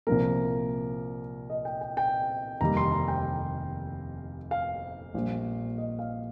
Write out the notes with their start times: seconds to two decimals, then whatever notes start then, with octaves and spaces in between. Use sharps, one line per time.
0.07 C2 A#2 F3 A#3 A#4
1.50 D#5
1.65 G5
1.81 G5
1.97 G5
2.61 F1 D#2 D#3 G3 A#3 A#5
2.77 C6
2.92 A#5
3.08 G5
4.51 F5
5.14 A#1 A#2 G3
5.78 D#5
5.99 F5